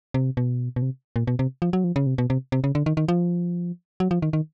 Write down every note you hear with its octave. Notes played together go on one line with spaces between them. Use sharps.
C3
B2
B2
C3
A#2
B2
C3
F3
F#3
F3
C#3
C3
B2
C3
C3
C#3
D3
D#3
D#3
F3
F#3
F3
D#3
D#3